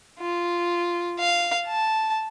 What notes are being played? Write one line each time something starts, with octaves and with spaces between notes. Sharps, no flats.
F4
F5
A5